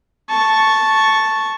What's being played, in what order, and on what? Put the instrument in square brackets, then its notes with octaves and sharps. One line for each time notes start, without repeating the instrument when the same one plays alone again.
[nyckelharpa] A5 C#6